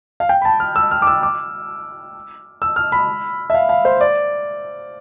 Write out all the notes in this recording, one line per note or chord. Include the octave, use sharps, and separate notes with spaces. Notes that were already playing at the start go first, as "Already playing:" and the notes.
F5
G5
B5
A5
F6
E6
F6
D6
E6
D6
E6
F6
B5
E5
F5
F5
C5
D5